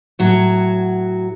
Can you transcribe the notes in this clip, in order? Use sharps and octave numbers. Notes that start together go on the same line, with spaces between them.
A2 F#3 F#4